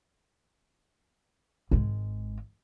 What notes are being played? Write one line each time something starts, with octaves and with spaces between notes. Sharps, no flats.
G#1 G#3